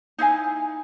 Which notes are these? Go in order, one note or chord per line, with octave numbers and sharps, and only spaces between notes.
D#4 E4 F5 G#5